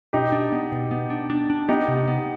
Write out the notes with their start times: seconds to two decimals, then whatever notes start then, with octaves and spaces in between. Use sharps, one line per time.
0.13 B2 D#4 G4
0.32 D4
0.52 B3
0.72 B2
0.91 B3
1.10 D4
1.30 D4
1.50 D4
1.68 B3 D#4 G4
1.88 C3
2.08 B3